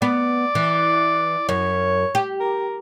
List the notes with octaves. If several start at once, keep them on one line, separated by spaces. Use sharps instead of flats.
B3 D5
E3
F#2 C#5
G4
A#4